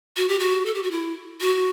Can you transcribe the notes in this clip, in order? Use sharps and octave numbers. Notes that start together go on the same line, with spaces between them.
F#4
G4
F#4
A4
G4
F#4
E4
F#4